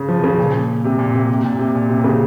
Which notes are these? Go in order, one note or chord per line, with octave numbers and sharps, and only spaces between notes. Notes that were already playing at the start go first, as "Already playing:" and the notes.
Already playing: C#3
F3
C#3
A#2
C3
A#2
C3
C3
A#2
C3
A#2
C3
C3
C#3